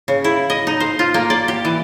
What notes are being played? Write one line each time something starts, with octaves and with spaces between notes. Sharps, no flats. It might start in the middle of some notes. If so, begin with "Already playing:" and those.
C#3
E4
D#5
D#4
C5
F4
A#3
D5
G4
E3